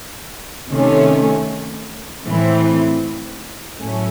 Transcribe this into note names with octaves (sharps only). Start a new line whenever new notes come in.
C3 D#3 A3 C#4
A2 E3 C4
A2 F#3 A3 C#4